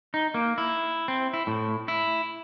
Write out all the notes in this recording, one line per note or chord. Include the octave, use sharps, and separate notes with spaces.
D#4
A#3
E4
C4
E4
A2
E4